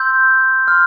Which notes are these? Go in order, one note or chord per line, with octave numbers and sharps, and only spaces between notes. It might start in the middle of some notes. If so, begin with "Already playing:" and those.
Already playing: C6 E6 G6
C6 F6